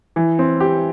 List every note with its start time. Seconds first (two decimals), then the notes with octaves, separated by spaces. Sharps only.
0.16 E3
0.39 C4
0.60 G4